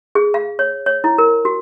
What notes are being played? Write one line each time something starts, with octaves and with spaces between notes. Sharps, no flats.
G#4
F5
C#5
C#5
E4
A#4
F#4